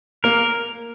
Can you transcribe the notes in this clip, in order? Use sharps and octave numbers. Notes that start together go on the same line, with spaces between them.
A#3 A#4